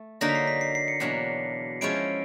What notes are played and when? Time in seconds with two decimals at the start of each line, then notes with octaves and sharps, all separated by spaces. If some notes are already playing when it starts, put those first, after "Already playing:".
Already playing: A3
0.21 D3 F#3 A#3 D#4 A#6
0.29 B6
0.35 C7
0.47 B6
0.61 C7
0.75 C7
0.88 C#7
1.00 E2 B2 F#3 A#3 D4
1.81 F3 G#3 C#4 E4 D7